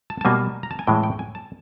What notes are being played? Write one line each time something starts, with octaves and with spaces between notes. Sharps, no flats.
A5
A5
B2 G3 A#3 G#5
A#5
A5
G#5
A2 E3 G#3 G5
G5
G#5
A5